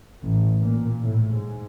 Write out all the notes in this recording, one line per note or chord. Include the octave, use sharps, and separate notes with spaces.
A1
A#2
A2
G#2